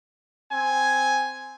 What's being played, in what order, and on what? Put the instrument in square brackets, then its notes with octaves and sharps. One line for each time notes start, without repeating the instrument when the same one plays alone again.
[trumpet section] C4 G#5